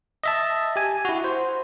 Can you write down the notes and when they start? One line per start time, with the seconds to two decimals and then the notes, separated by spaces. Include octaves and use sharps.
0.24 D#5 E5 A5
0.76 G4 G#5
1.05 E4 F#4
1.24 C5